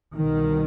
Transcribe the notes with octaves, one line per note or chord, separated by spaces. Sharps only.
C2 B2 D#3